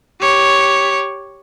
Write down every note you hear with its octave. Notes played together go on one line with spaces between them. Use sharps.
G4 C#5